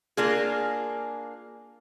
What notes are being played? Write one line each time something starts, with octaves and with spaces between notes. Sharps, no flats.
A#3 D4 F4 G#4